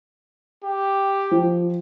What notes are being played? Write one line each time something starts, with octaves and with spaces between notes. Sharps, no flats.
G4
F3